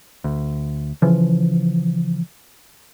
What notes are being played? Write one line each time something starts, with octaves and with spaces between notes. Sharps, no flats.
D2
C#3 E3 F3